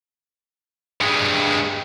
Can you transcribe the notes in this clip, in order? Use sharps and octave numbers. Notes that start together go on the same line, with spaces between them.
G2 G#3